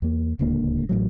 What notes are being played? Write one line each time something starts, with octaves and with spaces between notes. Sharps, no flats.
E2 A#3
D1 C#2 D3 A#3
A1 A2 F#3